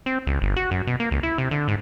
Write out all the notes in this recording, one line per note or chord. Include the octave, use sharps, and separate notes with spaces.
C4
C#2
G1
F#4
F#2
B2
A#3
C#2
E4
C3
D3
G#2